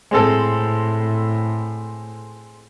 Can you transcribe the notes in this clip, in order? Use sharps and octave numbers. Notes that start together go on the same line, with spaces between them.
A2 G#3 C4 A4